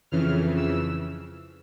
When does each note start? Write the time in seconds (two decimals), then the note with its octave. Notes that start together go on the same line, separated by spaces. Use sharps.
0.11 F2 C#3 E3 F6
0.57 E6